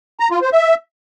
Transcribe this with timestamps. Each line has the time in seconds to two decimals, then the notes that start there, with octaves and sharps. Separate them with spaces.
0.20 A#5
0.31 F4
0.42 C5
0.53 E5